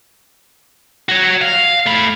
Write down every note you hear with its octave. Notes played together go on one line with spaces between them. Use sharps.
F#4 C#5
F5
A3 B5